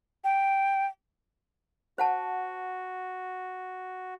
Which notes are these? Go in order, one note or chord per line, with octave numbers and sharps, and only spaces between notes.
G5
F#4 C5 F#5 A5